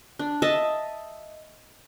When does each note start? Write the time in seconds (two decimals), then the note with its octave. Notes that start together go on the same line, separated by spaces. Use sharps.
0.19 D4
0.42 D#5 E5 A5